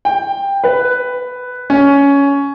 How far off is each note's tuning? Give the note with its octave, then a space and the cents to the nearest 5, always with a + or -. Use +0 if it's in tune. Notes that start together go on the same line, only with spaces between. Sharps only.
G5 +15
B4 +10
C#4 +15